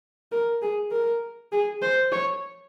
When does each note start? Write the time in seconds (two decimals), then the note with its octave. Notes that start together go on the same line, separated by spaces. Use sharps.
0.32 A#4
0.62 G#4
0.92 A#4
1.52 G#4
1.82 C5
2.12 C#5